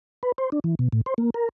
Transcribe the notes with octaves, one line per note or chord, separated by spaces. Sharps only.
B4
C5
D4
E3
B2
A2
C5
A#3
A#4